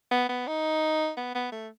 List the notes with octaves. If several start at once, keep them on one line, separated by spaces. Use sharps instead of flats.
B3
B3
D#4
B3
B3
A3